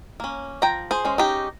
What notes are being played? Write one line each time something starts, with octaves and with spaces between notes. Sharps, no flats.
A#3 C#4
F3 G5 A#5
G#4 C5
G#3 C#4
D#4 G4